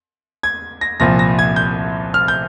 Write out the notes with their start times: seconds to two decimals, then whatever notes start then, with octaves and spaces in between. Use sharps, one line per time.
0.43 G#6
0.81 A#6
1.00 C2 A#2 F3 A#6
1.19 A#6
1.39 G#6
1.56 G6
2.14 F6
2.28 G6